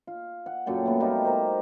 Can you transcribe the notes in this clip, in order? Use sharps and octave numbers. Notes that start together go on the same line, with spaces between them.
F4
F#5
F#2 A#2 A4 G5
A3 B3
G3 D#4 F4 G4
A#4 C5